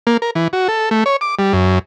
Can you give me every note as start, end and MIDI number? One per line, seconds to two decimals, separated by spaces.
0.07 0.17 58
0.22 0.31 70
0.35 0.48 52
0.53 0.68 66
0.68 0.89 69
0.91 1.04 57
1.06 1.16 73
1.21 1.35 86
1.39 1.53 55
1.53 1.79 42